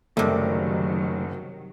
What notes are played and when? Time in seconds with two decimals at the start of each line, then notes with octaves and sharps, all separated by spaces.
0.17 F#1 C3 D#3 F#3 G3 A3 A#4 D6